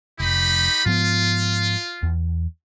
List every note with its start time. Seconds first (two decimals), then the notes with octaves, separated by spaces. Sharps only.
0.20 F1 D#4 G4 B5
0.86 G#2 F3 B3 F4
2.03 E2